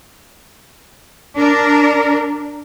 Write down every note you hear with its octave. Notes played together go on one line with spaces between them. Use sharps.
D4 A#4